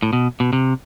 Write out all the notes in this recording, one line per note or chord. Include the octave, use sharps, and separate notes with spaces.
A2
B2
B2
C3